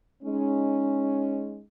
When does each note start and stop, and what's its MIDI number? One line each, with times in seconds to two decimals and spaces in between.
0.23 1.61 56
0.23 1.61 61
0.23 1.61 63